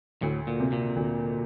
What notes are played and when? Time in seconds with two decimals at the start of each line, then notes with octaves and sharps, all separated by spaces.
0.22 D2 A2
0.47 A#2
0.60 C3
0.72 A#2
0.96 D2